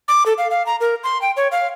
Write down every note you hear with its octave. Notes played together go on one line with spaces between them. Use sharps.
D6
A4
F5
F5
A#5
A#4
C6
G5
C#5
F5